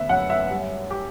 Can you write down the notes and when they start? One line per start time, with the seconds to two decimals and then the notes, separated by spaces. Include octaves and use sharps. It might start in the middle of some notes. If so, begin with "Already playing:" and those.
Already playing: D2 B3 E5
0.09 F#2 F#5
0.30 E5
0.50 G3
0.91 G4